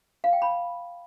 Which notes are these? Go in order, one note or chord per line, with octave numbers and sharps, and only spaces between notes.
F5
G5
B5